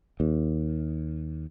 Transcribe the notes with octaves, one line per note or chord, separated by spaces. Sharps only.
D#2